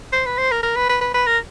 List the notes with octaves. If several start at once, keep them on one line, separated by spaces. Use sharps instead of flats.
C5
B4
C5
A#4
A#4
B4
B4
B4
B4
A#4